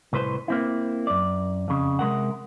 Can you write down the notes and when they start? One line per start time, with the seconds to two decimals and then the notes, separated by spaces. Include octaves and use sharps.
0.13 C2 A2 B4 C5
0.48 A#3 C4 E4
1.07 F#2 D5
1.68 F2 C#3
1.99 C3 G#3 A#4 F#5